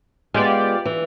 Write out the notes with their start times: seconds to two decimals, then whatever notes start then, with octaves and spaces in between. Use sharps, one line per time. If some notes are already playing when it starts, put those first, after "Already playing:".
0.34 G#3 B3 F4 G4 D5
0.85 E3